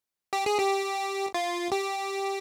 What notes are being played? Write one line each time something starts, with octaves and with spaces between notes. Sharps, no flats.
G4
G#4
G4
F4
G4